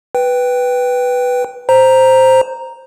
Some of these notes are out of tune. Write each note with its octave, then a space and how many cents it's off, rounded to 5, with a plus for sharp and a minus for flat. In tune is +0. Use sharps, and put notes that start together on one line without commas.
B4 +0 G5 +0
C5 +0 A#5 +0